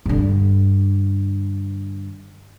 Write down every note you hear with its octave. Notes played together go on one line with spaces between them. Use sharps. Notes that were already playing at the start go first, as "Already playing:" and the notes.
G2 D3